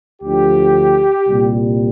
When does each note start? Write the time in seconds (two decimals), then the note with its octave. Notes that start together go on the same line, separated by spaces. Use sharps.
0.21 D2 D3 F3 G4
1.27 C2 A#2 G3